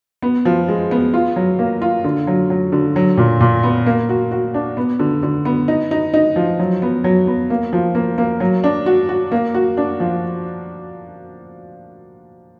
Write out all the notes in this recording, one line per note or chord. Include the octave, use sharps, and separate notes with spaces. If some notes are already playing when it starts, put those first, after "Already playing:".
B3
F3
G#3
B3
F4
F#3
A#3
F4
D3
F#3
F#3
D3
F#3
A#2
A#2
B3
A#3
F#4
F#4
D4
B3
D3
D3
B3
D#4
D#4
D#4
F3
F#3
B3
F#3
B3
A#3
F3
A#3
A#3
F#3
D4
F#4
F#4
A#3
F#4
D4
F3